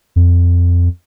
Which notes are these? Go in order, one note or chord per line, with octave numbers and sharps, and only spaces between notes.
F2